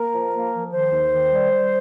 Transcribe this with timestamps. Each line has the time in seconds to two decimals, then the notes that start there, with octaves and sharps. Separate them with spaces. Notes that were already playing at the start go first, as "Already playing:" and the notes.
Already playing: A#3 A#4
0.12 F3
0.32 A#3
0.52 F3
0.71 D#3 C5
0.92 D#2
1.12 D#3
1.32 G3
1.52 G3